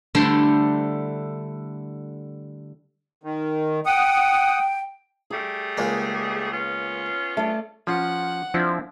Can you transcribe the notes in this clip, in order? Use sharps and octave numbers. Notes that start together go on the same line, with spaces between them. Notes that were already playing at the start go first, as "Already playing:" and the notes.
D3 G3 A3 D4 E4 C5
D#3
F#5 G5 D#6
G3 A3 G#4 D6
C#2 G#3 A#3
B3 C#4 F4
A3 D5
F3 C#4 F4 F#5
F3 C4 D4 E4